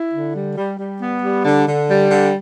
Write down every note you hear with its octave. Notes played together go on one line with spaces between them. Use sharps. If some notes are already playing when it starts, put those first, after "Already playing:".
Already playing: E4
D3
G3
G3
G3
B3
G3
D3
D3
G3
D3